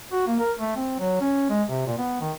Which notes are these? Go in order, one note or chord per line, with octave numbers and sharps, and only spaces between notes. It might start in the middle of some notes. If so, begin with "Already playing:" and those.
F#4
A#3
A#4
A3
C4
F#3
C#4
G#3
C3
A#2
B3
D#3